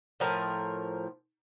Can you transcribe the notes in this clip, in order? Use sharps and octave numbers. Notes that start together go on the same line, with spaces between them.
A2 F3 A#4